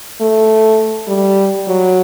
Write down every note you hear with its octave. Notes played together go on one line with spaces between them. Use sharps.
A3
G3
F#3